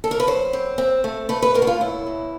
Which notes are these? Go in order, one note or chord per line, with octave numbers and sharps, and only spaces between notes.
A4
A#4
B4
F#3 C5
C4
C4
A3
A3 B4
B4
B2 A#4
F#4
F4
F#3 E4
B2